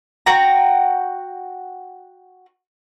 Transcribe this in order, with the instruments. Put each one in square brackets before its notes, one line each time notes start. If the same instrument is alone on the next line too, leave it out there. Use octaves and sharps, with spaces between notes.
[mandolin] F#4 G5 A#5